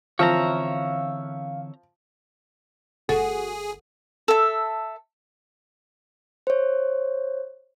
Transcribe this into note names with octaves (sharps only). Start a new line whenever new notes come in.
D3 E3 F3 C4 C#5 E5 F5 A#5
G1 F#4 G#4 A4
A4 E5
C5 C#5